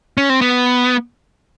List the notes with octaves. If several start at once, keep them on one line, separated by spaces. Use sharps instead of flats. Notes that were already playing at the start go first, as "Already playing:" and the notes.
C#4
C4
B3